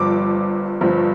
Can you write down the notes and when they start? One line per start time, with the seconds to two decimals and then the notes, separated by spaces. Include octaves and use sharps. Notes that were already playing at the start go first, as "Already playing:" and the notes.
Already playing: G1 G2 F3 D6
0.81 G1 G2 F3